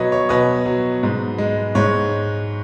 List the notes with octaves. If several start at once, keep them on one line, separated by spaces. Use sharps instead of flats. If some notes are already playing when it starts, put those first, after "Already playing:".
Already playing: B2 F#3 B4 C#5 D#5
C#5
B2 B4 D#5
F#3
G#2
G#3
G#2 C#5